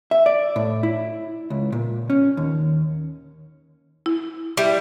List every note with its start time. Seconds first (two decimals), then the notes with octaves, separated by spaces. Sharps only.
0.11 E5
0.26 D5
0.56 A2
0.83 E4
1.50 C#2
1.72 A#2
2.10 C#4
2.37 D#2
4.06 E4
4.57 G3 E4